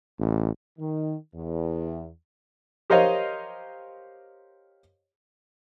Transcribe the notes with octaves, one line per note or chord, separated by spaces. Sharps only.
A1
D#3
E2
G4 A#4 C5 C#5 D#5 F5